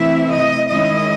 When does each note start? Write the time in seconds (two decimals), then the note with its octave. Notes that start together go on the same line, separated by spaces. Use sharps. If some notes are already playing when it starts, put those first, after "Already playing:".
Already playing: C3 E3 A3 C4 E4 E5
0.31 D#5
0.70 D#3 G#3 C#4 E4 D#5